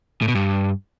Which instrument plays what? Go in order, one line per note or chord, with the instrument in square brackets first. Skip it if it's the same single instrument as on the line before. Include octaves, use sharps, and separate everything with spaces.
[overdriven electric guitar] A2
B2
G2